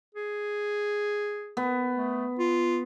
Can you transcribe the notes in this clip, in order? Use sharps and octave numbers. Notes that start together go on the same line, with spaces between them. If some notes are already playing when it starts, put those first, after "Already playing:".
G#4
B3
A3
F4